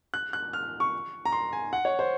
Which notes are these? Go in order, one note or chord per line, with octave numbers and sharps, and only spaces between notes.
F#6
F#6
F6
C#6
A#5
C6
G#5
F#5
C#5
C5